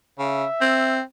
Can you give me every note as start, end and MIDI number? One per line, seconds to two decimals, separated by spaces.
0.19 0.45 49
0.19 1.01 76
0.61 1.01 60